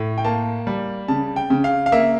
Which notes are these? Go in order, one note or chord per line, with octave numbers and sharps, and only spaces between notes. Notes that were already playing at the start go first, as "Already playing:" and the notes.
Already playing: A2
G5
A#3 A5
G3
C#3 A5
G5
C#3
F5
F5
A#3 E5